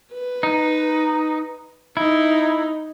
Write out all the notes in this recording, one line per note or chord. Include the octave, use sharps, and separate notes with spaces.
B4
D#4
D#4 E4